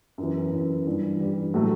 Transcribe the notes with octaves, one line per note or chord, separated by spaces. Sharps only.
F#2 E3 B3
F#2 E3 B3
G2 E3 G3
G2 E3 G3
A2 F#3 A3